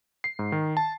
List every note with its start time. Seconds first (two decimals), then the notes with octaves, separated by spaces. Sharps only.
0.24 C7
0.39 G#2
0.52 D#3
0.77 A5